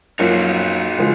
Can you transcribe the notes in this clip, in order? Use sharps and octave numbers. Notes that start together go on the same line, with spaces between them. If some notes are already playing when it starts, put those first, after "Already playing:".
F#2 F3 A#3 C#4 D#4 F4 F#4
C#3 F3 G#3